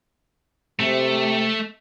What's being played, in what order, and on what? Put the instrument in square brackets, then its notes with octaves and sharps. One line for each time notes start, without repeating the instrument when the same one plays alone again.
[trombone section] C3 [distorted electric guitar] A3